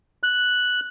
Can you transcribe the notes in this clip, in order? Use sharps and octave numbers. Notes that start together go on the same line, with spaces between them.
F#6